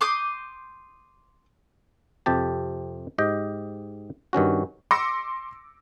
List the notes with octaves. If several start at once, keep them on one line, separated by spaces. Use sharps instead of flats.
C6 D6 D#6 G6
F2 C3 G4 A5
G#2 G4 D#5 G5
G2 D#3 C#4 F#4
C6 D6 E6 A#6 C#7